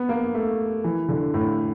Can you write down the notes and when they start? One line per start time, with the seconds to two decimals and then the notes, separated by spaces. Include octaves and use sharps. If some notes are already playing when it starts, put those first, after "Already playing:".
Already playing: B3
0.09 A#3
0.34 A3
0.84 E3
1.09 D3
1.34 A2